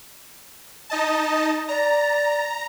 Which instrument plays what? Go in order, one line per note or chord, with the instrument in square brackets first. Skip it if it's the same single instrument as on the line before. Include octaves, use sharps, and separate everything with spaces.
[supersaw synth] D#4 D#5 A5
[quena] D5 [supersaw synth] A#5